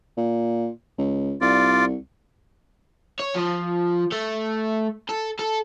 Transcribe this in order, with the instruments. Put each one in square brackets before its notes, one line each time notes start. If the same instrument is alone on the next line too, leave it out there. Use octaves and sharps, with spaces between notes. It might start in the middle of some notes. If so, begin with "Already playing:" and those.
[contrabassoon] A#2
C#2
[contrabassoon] C2 [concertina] F4 D5
[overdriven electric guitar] C#5
F3
A3
A4
A4